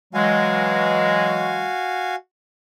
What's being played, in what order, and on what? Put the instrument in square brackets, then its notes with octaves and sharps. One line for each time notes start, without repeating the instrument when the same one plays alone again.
[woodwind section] E3 F#3 G#3 [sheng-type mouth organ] F#4 F5 G#5